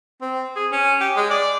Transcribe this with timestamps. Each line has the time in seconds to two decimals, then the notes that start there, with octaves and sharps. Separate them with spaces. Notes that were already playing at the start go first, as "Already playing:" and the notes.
0.22 C4
0.56 G#4
0.72 C#4
1.01 G4
1.16 G#3
1.30 D5